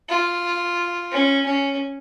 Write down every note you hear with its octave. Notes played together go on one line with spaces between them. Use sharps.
F4
C#4
C#4